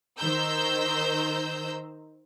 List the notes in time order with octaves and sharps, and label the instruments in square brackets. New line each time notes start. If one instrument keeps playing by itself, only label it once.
[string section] D#3 C5 A#5 E6 G6